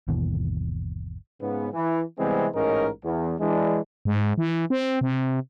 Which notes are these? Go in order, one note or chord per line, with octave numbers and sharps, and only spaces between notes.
G1 D#2 B2 E3
G#2 C#3 B3
E3
C3 E3 G3 G#3 B3 C4
A1 G#2 C#4 D#4 A#4
E2
E3 G#3 D4
G#2
E3
C4
C3